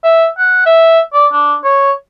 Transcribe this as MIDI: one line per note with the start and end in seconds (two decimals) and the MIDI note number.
0.04 0.26 76
0.38 0.65 78
0.66 1.00 76
1.13 1.27 74
1.33 1.55 62
1.64 1.92 73